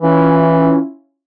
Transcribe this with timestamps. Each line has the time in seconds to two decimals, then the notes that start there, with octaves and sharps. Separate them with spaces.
0.01 E3 C#4 E4 F4